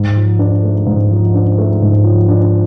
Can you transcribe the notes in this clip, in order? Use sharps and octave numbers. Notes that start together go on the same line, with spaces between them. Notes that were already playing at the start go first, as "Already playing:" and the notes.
Already playing: G#2
F3
D4
A3
G#2
F3
D4
A3
G#2
F3
D4